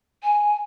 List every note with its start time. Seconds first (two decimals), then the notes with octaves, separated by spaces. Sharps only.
0.23 G#5